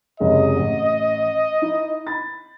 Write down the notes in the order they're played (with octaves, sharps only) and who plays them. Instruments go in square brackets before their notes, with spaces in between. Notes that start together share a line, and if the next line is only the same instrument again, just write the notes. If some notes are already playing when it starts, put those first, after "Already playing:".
[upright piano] F#1 C3 G#3 [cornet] D#5
[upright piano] A1
D#4 E4
B5 A6